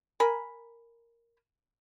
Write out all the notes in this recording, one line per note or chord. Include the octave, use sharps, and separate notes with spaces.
A#4 G#5 B5